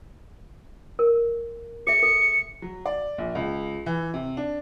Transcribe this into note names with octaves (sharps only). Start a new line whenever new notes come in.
A#4
G#4 E5 C#7
A4
F#3
D5
A#1
C#2
E3
C3
D4